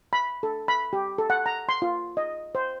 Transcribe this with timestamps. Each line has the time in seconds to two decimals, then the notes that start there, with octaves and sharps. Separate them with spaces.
0.13 B5
0.43 A4
0.68 B5
0.93 G4
1.18 A4
1.30 F#5
1.46 A#5
1.69 C6
1.82 F4
2.17 D#5
2.55 C5